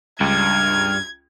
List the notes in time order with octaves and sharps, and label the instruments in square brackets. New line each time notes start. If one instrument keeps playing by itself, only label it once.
[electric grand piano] C#2 [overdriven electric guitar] G2 [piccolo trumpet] F6 [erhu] G#6